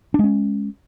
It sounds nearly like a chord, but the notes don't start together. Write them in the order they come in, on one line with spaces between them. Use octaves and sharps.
D4 G#3 C#4